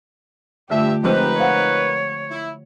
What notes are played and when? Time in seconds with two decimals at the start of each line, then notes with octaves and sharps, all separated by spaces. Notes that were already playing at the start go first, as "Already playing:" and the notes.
0.70 G2 D3 A3 F4 G4 E5
1.04 F3 G#3 C4 D#4 G4 A#4 B4
1.38 C5 C#5 F5 F#5
2.31 E4